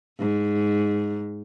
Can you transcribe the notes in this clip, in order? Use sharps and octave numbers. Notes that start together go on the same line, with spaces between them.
G#2